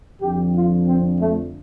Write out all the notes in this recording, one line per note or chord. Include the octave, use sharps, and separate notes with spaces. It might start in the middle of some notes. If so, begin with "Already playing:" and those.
F2 D3 F3 G4
F4
C4
A3